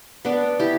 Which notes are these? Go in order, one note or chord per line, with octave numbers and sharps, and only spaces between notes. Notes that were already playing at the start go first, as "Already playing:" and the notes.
B3 D4
E4 G4